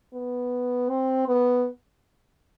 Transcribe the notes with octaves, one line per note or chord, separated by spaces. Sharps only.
B3
C4
B3